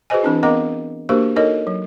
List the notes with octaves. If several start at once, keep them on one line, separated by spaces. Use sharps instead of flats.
F#4 G#4 B4 C5 D#5 G#5
E3 C4 D4 E4
B3 C4 A#4 D#5 A#5 D6
A#3 D4 F#4 G4 A#4 C5
D#4 F#4 A4 A#4 C#5 D#5
F#3